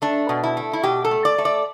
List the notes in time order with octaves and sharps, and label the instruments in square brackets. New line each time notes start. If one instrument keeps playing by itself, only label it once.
[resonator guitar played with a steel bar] A3 D4
B2
E4
A3
E4
B2 G4
A4
A3
D5
A3
D5